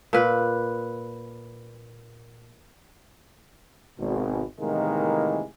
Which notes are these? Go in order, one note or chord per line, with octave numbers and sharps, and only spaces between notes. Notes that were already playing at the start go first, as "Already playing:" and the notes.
A#2 B4
G#1 B2
A2 C3 D#3 E3 G#3 A#3